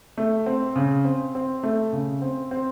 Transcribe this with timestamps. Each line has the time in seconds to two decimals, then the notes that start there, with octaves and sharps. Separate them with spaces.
0.18 A3
0.46 C4
0.76 C#3
1.05 C4
1.35 C4
1.63 A3
1.93 C#3
2.22 C4
2.51 C4